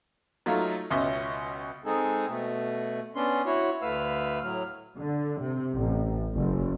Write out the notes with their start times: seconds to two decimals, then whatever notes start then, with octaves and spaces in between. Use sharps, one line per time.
0.46 F#3 A3 D#4 F4
0.90 C#2 B2 C#4 D#5 E5
1.85 G#3 C4 D#4 G#4 A4
2.28 B2 A3
3.15 B3 C#4 D4 C6
3.46 E4 F#4 C#5
3.82 D2 A3 B4 F5 E6 F6
4.42 A2 F#3 F6
4.97 D3
5.41 C3
5.74 A1
6.35 F#1